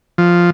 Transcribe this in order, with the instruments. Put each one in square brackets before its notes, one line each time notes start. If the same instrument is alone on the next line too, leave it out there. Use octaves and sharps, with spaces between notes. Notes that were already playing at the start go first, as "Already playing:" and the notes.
[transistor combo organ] F3